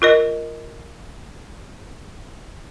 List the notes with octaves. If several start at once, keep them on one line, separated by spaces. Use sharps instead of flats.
F4 A#4 D#5